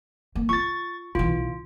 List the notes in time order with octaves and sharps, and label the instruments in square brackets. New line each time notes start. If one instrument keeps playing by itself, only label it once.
[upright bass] A#3
[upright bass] F4 [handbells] C#6 A6
[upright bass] B1 E3 [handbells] F4